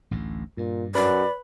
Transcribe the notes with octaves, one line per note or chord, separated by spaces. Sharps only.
A1 D2 A2
G2 A#2
F#2 B4 D5 B5